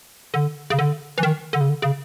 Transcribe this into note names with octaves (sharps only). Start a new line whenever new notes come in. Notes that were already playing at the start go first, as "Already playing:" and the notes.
D3
C#3
D3
E3
D#3
D3
C#3
D3
C#3